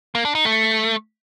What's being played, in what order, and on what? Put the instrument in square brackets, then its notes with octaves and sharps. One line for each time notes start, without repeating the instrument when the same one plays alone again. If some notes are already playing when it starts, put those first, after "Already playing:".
[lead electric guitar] A#3
D4
D#4
A3